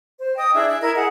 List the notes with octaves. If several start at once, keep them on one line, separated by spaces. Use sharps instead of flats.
C5
D#5 G5 D#6
D4 E4 G#4 E5
E5
E4 A#4 D#5 G#6
G#4 F#5